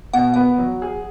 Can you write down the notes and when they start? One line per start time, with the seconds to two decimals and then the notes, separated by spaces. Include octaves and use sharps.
0.13 B2 F#5
0.34 B3 F#5
0.58 F#3
0.82 G#4